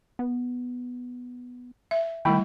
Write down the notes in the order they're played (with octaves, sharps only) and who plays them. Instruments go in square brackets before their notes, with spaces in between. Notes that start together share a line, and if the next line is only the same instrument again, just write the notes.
[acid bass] B3
[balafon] E5
[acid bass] D#3 [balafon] G3 A3 E4 [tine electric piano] G5 B5